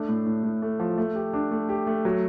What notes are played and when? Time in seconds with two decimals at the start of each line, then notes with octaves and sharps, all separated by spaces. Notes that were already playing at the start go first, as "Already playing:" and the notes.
Already playing: A3 D4
0.09 A2
0.27 A2
0.43 A2
0.62 A3
0.80 F3
0.98 A3
1.15 G4
1.33 D4
1.51 A3
1.69 G4
1.87 A3
2.05 F#3